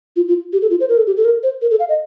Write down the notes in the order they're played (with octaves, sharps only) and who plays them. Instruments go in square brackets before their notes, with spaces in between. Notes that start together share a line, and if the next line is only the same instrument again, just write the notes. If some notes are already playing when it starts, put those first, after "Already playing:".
[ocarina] F4
F4
G4
A4
F4
C5
A#4
A4
G4
A4
A#4
C5
A#4
A4
F5
D#5